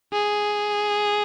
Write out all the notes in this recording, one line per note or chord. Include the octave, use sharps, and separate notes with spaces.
G#4